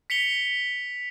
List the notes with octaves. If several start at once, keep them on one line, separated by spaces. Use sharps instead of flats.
B6 C#7 F7 G7